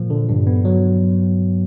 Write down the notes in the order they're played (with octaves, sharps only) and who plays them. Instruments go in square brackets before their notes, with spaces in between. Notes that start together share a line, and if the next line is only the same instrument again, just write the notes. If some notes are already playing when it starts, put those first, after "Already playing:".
Already playing: [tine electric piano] A#2 F3
D3
G2
B3
F#3